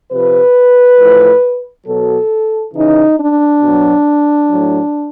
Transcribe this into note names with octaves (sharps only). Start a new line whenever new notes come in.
C3 F3 B4
A2 F3
B2 F#3 A4
C#3 E3 D#4
D4
B2 F#3
A2 F#3